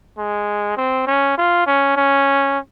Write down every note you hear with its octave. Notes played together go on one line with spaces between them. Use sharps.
G#3
C4
C#4
F4
C#4
C#4